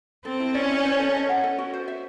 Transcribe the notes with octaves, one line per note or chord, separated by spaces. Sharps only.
C4 A4
E4
C#4 D5
E4
C5
A4
D#5
F#5
A4
F#4
C5
E5